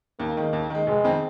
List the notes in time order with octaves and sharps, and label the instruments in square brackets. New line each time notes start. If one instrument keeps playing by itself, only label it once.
[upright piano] D#2 [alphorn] A#3
[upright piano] D#3 G#3
D#2
D#3 G#3
[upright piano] F1 [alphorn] G#3
[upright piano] F2 D#3 C4